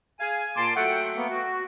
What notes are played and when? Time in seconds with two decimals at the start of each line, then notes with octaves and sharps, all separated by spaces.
0.20 G#4 F5 G#5
0.56 A#2 A5 C6 D6
0.76 F#3 A3 F#5 G5
1.16 A#3 B3
1.30 F#4